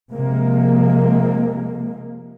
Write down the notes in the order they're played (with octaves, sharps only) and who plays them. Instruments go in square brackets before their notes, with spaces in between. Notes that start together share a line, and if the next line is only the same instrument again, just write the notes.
[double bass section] C3 F3 G#3 A#3